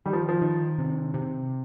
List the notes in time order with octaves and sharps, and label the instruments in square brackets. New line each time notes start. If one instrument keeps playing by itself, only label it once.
[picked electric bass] D#3 [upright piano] G3
[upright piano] F3
F3
[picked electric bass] D#3
C3
C3